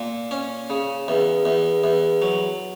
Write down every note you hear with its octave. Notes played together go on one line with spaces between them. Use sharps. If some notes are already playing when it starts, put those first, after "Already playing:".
Already playing: A#2
C#4
C#3
E2
E2
E2
F#3